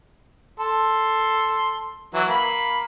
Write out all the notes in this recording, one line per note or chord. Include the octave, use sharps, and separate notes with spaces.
A4 C6
E3 F#3
A#3 B5